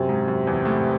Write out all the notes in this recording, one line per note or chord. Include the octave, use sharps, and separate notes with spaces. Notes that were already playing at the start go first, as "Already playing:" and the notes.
Already playing: F#2 C3
G#2
F#2
E2
A2